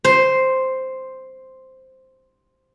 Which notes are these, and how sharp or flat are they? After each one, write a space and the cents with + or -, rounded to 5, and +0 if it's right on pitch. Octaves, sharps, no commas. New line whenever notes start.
C5 +0